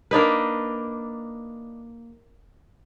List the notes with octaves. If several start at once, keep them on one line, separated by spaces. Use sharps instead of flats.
A#3 D4 D#4 B4